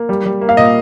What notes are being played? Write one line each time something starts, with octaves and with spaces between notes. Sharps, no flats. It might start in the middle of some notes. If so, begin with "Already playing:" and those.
Already playing: A#3
G3
G3
A#3
F5
A#2 D#5